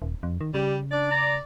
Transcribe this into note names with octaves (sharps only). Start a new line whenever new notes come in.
D#1
F2
D#3
C#3 G3
D4 D5
A#5